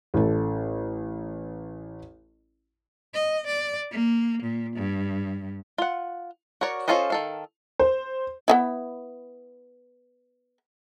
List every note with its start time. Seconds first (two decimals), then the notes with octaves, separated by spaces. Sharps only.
0.14 A1 A4
3.14 D#5
3.47 D5
3.91 A#3
4.43 A#2
4.76 G2
5.78 F4 F#5
6.61 F#4 A#4 C#5 D5
6.88 C#4 F4 A4 C5 D#5
7.10 D#3 A4 F5
7.79 C5
8.48 B3 D#4 E4